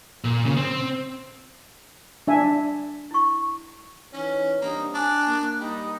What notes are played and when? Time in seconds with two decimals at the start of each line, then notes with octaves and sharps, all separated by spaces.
0.24 A#2
0.45 C#3
0.57 C4
2.27 D4 E5 G#5
3.11 E4 C#6
4.14 E3 C#4 D#4 C#5
4.62 G3 A#3 C4 D4 D#4
4.95 D4 G#5 F#6
5.28 A#3
5.60 G3 D#4